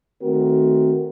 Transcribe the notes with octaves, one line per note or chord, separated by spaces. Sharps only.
D#3 A3 C4 F#4 A#4